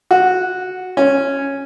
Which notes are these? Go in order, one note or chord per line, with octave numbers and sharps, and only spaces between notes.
F#4
C#4